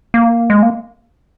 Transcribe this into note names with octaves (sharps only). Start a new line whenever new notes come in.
A#3
G#3
A#3